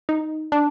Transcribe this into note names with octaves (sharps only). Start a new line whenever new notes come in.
D#4
D4